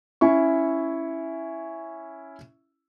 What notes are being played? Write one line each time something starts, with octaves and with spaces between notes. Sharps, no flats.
C#4 E4 E5 C#6